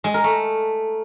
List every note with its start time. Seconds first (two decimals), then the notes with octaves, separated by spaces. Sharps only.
0.04 G#3
0.14 A#4
0.24 A3